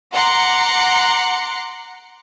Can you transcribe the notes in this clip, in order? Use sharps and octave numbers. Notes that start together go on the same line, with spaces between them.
F#5 A#5 C6 D6 F#6 C#7